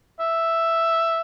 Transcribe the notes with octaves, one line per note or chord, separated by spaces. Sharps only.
E5